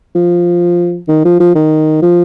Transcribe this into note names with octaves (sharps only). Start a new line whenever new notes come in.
F3
D#3
F3
F3
D#3
F3